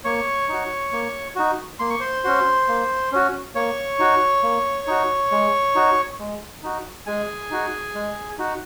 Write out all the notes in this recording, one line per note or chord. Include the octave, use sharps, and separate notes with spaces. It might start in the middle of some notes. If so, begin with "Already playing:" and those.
A#3 C#5 C#6
D#4 F#4
A#3
D#4 F#4
A#3 C6
C#6
C5 C6
C#4 F#4
A#3
C#4 F#4
A#3 C#5 C#6
D#4 F#4
A#3
D#4 F#4
G#3
D#4 F#4
G#3
D#4 F#4
G#3 G#4 G#5
D#4 F#4
G#3
D#4 F#4